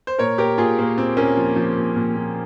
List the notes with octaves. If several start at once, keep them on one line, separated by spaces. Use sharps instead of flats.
C5
A#2 A#4 C#5
A#2 G4 A#4
A#2 F4 G#4
A#2 A#3
A#2 C4
A#2 A#3 C#4
F3
F3
A#2
A#2
A#2